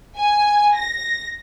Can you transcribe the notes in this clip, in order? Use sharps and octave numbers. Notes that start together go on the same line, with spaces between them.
G#5
A#6